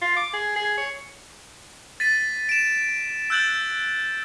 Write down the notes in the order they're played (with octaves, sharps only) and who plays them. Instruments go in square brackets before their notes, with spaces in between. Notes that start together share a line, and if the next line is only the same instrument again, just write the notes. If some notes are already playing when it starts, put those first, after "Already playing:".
[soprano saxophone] F4
D6
G#4
G#4
C#5
[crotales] A6 B6 D#7
D7 E7
E6 F#6 G6 A6 F#7